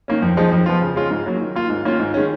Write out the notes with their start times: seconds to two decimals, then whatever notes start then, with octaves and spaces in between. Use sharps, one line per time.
0.08 D#3 A#3 C#4
0.22 F2
0.37 F3 G#3 D#4
0.52 F2
0.66 F3 B3 F4
0.81 C#3
0.96 G#3 C#4 F4
1.11 G#2
1.26 F#3 A#3
1.41 D#3
1.56 A#3 F4
1.70 G#2
1.85 D#3 A#3 C#4 F4
1.99 G#2
2.14 D#3 G#3 C#4